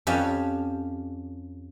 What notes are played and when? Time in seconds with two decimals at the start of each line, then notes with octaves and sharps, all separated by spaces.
0.07 F2 C#4 G4 F5 A5